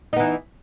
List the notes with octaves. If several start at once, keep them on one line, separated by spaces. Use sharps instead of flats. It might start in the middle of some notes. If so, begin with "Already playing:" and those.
E3 B3 D#4